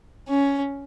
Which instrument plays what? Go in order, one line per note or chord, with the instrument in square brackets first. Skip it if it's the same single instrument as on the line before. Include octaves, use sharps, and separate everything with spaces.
[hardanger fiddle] C#4